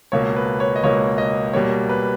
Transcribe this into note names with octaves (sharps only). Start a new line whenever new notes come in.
C#2 B2 A#3 C#5
B4
C#5
D#5
C#2 B2 A#3 C#5
D#5
B2 G3 A#3 C#5
B4